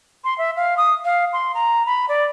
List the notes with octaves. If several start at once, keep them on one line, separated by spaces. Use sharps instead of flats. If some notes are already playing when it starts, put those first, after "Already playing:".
C6
E5
F5
D#6
F5
C6
A#5
B5
D5